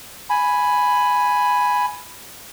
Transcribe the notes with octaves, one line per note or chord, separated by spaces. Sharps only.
G#5 B5